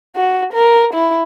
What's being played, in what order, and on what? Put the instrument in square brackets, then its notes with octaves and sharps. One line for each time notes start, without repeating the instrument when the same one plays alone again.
[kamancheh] F#4
A#4
E4